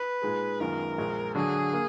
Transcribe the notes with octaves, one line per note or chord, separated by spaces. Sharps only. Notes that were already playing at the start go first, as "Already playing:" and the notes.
Already playing: B4
A#2 G#3 D#4 G#4
F#2 D#3 G#3 B3 F4 A#4
A#1 A#2 G#3
D3 F#3 D4 G#4
A#3